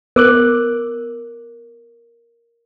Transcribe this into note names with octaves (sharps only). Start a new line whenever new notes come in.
B3 A#4 D6 F#6